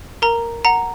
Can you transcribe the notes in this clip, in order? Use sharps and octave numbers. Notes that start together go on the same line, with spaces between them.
A#4 A#5
F#5 A#5